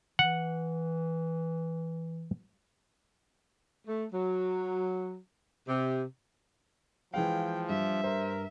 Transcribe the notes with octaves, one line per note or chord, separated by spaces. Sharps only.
E3 F#5
A3
F#3
C3
E3 F3 G#3 F5 G5
G2 E5
A#4 C5